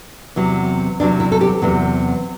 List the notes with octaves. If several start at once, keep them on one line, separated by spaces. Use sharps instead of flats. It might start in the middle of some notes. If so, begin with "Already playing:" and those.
E2 C3 F#3
E2 C3 F#3 D4
E4
A4
G4
E2 C3 F#3